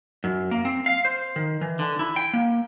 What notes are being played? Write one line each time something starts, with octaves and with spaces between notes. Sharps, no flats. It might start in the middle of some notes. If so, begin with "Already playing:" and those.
F#2
A#3
C4
F5
C5
D#3
E3
D3
E4
G5
A#3